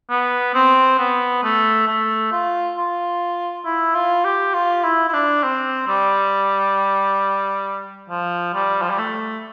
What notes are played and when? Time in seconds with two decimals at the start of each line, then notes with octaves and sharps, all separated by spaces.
0.10 B3
0.55 C4
0.99 B3
1.44 A3
1.88 A3
2.32 F4
2.77 F4
3.65 E4
3.95 F4
4.25 G4
4.54 F4
4.84 E4
5.09 E4
5.14 D4
5.43 C4
5.88 G3
8.10 F3
8.54 G3
8.82 F3
8.90 G3
8.99 A3